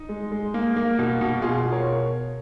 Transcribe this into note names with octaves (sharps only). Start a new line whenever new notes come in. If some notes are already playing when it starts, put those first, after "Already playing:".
Already playing: D#4
G#3
G#3
A#3
A#3
B2
B2
B2 F4 G#4
B2
A#4 C#5